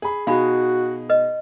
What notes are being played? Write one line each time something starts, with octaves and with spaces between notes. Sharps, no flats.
G#4 B5
B2 D#4 F#4 G#4 F5 B5
B4 D#5